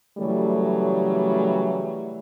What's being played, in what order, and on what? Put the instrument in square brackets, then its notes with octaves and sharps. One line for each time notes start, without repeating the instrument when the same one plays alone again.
[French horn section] C#3 E3 F#3 G3 A3